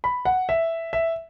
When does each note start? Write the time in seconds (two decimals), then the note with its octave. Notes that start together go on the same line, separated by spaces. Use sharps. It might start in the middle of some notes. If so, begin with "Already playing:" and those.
0.04 B5
0.25 F#5
0.49 E5
0.93 E5